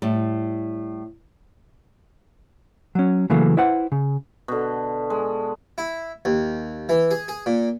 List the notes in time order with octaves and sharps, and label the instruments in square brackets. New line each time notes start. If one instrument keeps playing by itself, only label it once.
[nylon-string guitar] A2 G3
[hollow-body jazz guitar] F#3 C#4
C#3 E3 F#3 A3 A#3
E4 B4 C5 F#5
C#3
[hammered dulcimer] B2 D3
G#3 A4
[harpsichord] E4
D#2
E3
G#4
G#4
A#2